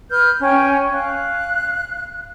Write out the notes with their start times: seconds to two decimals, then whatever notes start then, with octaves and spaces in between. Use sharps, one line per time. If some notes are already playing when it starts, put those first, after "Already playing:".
0.10 B4 F6 G6
0.41 C#4 G5
0.92 F5 F#6